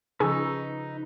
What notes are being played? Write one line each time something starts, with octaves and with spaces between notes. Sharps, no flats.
C#3 F3 D#4 G#4 B4 C#6 E6